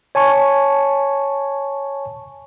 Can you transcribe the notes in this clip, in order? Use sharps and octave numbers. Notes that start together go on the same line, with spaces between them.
C#5 G#5 A5 C#6